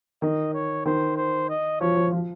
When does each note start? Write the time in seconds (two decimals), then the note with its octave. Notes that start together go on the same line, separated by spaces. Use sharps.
0.22 D#3 D#5
0.54 C#5
0.86 D#3 C5
1.17 C5
1.49 D#5
1.80 F3 C#5
1.96 F3
2.12 F3